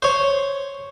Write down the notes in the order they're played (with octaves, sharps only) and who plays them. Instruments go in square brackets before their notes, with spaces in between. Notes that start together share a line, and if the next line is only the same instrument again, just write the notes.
[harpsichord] C5 C#5